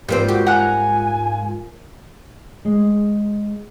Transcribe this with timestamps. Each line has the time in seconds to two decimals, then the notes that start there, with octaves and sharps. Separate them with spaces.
0.09 G#2 G3 A#3 C4 F4 G4 G6
0.28 F#4 G4
0.47 F#5 G#5 A#5 F#6
2.65 G#3